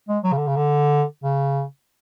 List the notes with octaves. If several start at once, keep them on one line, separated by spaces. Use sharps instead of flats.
G#3
F#3
C#3
D3
C#3
D3
C#3